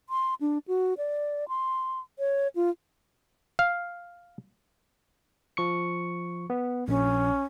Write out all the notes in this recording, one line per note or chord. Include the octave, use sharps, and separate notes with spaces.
C6
D4
F#4
D5
C6
C#5
F4
F5
F3 C#6 C#7
B3
A#1 C#4